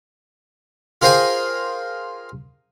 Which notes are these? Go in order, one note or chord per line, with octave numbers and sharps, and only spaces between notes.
F4 G#4 A#4 C5 G5 G#5